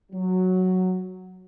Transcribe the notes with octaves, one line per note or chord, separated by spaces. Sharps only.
F#3